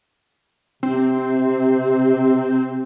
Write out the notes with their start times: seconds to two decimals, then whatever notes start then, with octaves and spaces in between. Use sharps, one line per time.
0.83 C3 C4